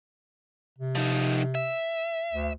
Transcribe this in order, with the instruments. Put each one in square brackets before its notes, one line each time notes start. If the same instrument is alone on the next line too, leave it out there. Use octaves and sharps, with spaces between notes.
[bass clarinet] C3
[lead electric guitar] F3 D#4
E5
[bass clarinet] D2